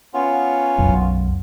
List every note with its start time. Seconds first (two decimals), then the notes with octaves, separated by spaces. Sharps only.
0.14 B3 C#4 F4
0.78 B1 F#2